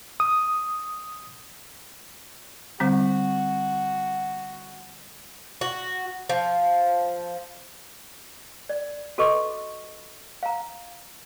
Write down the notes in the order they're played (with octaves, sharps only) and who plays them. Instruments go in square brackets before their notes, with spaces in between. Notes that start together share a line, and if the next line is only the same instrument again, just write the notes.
[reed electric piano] D#6
[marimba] D3 G3 C4 [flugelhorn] F#4
[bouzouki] F#4
F3
[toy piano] D5
F#4 A4 B4 D#5 C#6 D6
F5 A#5